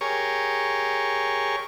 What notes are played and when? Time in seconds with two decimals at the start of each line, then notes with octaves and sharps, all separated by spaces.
0.01 G4 G#4 A#4 C#5 C#6